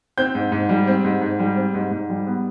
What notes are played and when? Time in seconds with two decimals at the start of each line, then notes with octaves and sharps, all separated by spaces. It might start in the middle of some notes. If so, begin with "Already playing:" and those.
0.17 C4 G6
0.35 G#2
0.52 G#2
0.69 G3
0.87 C4
1.04 G#2
1.22 G#2
1.39 G3
1.56 C4
1.74 G#2
1.91 G#2
2.10 G3
2.26 B3